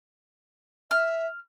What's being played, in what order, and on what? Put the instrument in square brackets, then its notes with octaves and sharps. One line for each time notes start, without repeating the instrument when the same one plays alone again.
[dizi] E5 [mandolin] F6